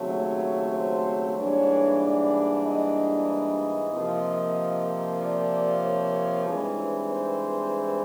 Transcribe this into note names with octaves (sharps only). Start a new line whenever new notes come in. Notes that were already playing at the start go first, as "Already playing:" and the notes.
Already playing: D#2 C#3 F#3 A3 C4
C#5
C5
G#2 E3 G3 A#3 D4 C#5
D5
D#5
C3 F3 A#3
D5
C#5
G2 E3 G#3 C4 D#4
C5